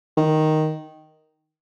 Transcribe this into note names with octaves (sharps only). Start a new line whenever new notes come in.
D#3